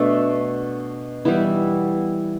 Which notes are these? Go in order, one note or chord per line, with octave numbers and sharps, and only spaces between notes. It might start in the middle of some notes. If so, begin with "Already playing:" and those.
Already playing: B2 A3 D4 A4
E3 G3 B3 E4